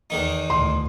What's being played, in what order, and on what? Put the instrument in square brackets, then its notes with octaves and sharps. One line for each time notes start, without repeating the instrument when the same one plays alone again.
[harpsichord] E2 D#3 D#4
[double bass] D2 A2 [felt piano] C6